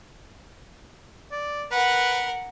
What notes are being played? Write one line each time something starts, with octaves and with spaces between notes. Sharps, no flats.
D5
A#4 B4 F#5